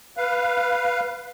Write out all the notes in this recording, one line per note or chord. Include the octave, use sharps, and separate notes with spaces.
B4 F5